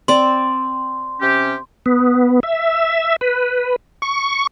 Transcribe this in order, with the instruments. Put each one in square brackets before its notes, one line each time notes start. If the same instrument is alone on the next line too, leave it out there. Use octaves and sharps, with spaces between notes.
[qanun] C4 D5 [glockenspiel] C6
[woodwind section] C3 C#4 G4
[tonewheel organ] B3
E5
B4
C#6